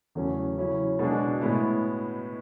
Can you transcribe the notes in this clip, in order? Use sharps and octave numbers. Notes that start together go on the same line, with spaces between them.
E2 C#3 F#3 A3 C#4
C#3 F#3 C#4 E4
B2 G#3 D4
A2 G#3 B3 E4